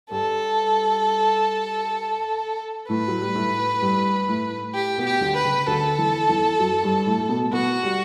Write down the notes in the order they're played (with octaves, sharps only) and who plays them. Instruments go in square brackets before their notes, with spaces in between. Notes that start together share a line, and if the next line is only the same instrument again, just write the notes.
[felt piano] G2 G3 [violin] A4
[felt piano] A2 A3 [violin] B4
[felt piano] F#3
G3
A2 A3
G2 G3
A2 A3
[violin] G4
[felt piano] B2 B3
[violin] G4
[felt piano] D2 D3
[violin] B4
[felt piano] C#3
[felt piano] D2 D3 [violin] A4
[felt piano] E2 E3
E2 E3
F#2 F#3
G2 G3
A2 A3
A3
B2 B3
[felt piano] B2 B3 [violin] F#4
[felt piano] G3